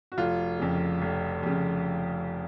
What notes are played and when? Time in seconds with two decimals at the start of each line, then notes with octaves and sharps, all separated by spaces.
0.12 F#4
0.18 F1 F4
0.59 F2 C#3
1.02 F1
1.43 F2 C#3